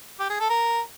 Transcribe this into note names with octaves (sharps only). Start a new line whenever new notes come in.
G4
G#4
A4
A#4